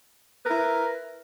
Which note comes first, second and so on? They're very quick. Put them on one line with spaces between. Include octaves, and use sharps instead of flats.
B4 A#4 E4